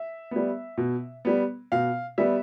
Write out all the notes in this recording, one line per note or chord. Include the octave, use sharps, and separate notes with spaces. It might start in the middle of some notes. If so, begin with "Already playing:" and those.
Already playing: E5
G3 B3
B2
G3 B3
B2 F5
G3 B3 E5